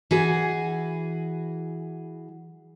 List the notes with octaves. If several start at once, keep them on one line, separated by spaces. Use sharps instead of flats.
E3 F#4 G#4